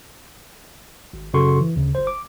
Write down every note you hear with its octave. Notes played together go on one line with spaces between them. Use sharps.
G#1
F#2 C#3 F#4 A4 C6 C#6
E3
D2 C#3
G1 C5
D6